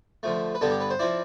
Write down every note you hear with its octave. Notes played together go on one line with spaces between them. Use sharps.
D3 F3 A3
B4
G2 D3 G3 B3 D4 A4
G4
B4
C5
F3 C4 E4 D5